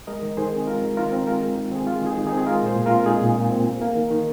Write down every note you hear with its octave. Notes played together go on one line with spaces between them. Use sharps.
G#3 A#4 D#5
D#3
D#3 G#4 C5
C4
G#3 F4 A#4
D#3
D#3 F4 A#4
C4
G#3 F4 A#4
D#3
D#3
C4 G#4
G#3 F4
D#3
D#4 G#4
D#3
C4 D#4 G#4
G#4
G#3 F4 A#4
A#2 G#4 C5
A#2
C4 F4 A#4
G#3 D#4 G#4
A#2
A#2
C4
A#3
A#3
D#3
D#3